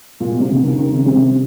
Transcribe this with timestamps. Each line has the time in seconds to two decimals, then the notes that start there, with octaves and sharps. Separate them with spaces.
0.20 A#2 A#3
0.30 B2
0.34 B3
0.40 C3
0.49 D3 B3
0.63 D#3 C#4
0.78 D#3 C#4
0.92 C#3 C4
1.06 C3 C4